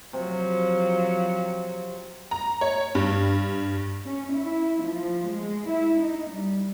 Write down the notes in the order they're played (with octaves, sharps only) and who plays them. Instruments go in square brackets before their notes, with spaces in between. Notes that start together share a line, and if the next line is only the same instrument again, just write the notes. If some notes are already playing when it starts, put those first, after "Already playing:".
[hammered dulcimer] C3 [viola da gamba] F3 F#3
[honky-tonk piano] A#5
C#5
G2
[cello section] C#4
E4
F3
G#3
E4
D#4
G3